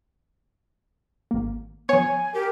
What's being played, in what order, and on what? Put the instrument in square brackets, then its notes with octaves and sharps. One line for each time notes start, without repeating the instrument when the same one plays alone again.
[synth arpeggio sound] G#1 A#3
[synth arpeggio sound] F3 B3 [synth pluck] C#5 [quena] G#5
[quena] G4 [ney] A#4